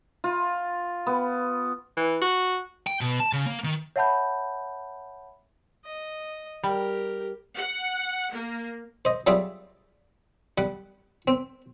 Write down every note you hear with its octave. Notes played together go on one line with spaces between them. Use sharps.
F4
B3
E3
F#4
G5
B2
A5
C#3
A#3
D#3
C#5 E5 F#5 A5 B5 G6
D#5
G3 G4 A#4
F#5
A#3
C5 D#5
F#3 G3 F4 G#4 D5 E5
G3 F#5
C4